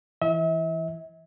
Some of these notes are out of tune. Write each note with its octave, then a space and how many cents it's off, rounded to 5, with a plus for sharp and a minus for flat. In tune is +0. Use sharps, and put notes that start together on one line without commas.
E3 +0 E5 -40